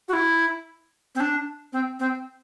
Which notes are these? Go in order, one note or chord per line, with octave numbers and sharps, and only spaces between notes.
F#4
E4
C4
D4
C4
C4